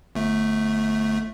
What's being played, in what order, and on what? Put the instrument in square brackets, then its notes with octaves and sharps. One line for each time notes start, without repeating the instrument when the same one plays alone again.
[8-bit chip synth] G1 A3